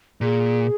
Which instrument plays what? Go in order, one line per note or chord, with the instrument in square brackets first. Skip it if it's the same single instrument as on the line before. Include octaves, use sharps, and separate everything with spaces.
[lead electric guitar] A#2 [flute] G#4